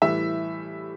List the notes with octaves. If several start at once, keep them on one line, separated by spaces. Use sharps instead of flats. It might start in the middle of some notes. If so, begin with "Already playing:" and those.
A2 E3 G3 E5